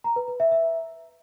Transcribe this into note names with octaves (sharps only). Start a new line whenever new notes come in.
A#5
B4
B4
E5
E5